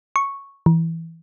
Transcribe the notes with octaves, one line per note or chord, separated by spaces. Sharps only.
C#6
E3